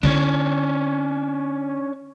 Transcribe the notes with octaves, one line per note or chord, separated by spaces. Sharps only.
D3 C#4 D4 E4